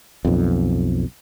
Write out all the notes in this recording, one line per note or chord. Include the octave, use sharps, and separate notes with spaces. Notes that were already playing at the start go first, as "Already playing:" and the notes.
B1 F2